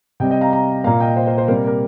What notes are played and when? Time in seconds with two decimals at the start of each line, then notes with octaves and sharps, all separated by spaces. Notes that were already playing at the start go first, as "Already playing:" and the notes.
0.20 C3 G3 C4 D#5 G5
0.31 D#5 G5
0.41 F5 A#5
0.52 F5 A#5
0.84 A#2 A#3 F5 A#5
1.00 D#5 G5
1.17 C5 F5
1.27 C5
1.38 C5
1.48 C3 G3 A#3 A#4
1.67 A#4